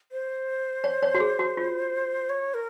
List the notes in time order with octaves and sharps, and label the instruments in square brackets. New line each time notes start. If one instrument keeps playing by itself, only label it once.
[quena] C5
[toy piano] C#5
C#5
F#4
G#4
F#4
F4
[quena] C#5
A#4